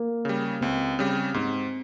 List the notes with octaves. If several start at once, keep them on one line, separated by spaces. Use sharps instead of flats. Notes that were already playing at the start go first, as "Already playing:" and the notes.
Already playing: A#3
C#3 G3
C#2 C4
C#3 G3
G#2 C4